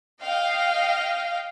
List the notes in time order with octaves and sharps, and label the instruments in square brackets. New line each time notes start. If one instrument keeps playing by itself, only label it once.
[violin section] D#5 F5 G5